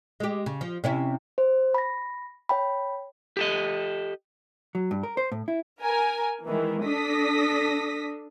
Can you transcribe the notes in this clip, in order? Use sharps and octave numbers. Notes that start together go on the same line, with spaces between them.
G#3 G4
C#3
F3
C3 C#4 E4
C5
B5 A#6
C#5 G5 B5
G4 A4 D#5
F#3
G2
A#4
C5
A2
E4
A#4 G#5
D#3 E3 G#3
D4 A4 D#6 A#6 B6